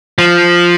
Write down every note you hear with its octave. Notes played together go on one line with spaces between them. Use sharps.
F3